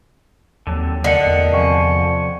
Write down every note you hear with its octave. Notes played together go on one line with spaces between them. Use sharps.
D#2 D3 F#3 C4
A2 D3 A#4 D#5 F#5
E2
C3 F3 G5 G#5 C#6